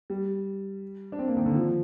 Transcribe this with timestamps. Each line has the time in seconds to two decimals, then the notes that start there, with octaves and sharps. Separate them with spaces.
0.10 G3
1.12 D4
1.19 C4
1.28 A#3
1.37 D#3
1.46 D3
1.55 F3